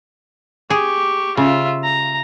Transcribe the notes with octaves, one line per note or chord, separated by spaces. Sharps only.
G4 G#4 C#6
C#3 F4 E5
A#5